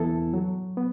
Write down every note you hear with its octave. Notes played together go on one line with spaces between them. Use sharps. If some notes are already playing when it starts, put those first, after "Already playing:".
Already playing: E2 E3 B3 E4 A4
F#3
B3